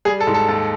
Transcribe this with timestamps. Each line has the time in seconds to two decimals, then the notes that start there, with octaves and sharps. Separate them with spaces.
0.05 G3 G#4
0.20 A4
0.27 G#2
0.34 A4
0.48 D#2 A4